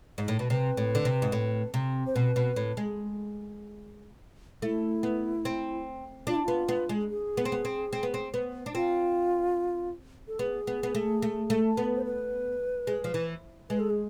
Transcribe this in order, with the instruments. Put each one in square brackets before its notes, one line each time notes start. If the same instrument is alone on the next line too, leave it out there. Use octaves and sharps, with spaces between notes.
[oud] G#2
A2
B2
[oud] C3 [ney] B4
[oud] A2
D3
C3
G#2
A2
C3
[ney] C5
[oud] B2 [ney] B4
[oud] B2
A2
G#3
[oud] A3 [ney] E4
[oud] B3
C4
[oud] D4 [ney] F4
[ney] E4
[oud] B3 [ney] F4
[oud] B3
G#3
[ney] G#4
[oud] B3
C4
B3
C4
C4
B3
C4
B3
D4
[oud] C4 [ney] F4
[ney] A4
[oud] B3 [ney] G#4
[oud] B3
B3
A3
A3
A3
B3
[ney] C5
B4
[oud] G#3
F3
E3
[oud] G#3 [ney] B4
[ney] A4
G#4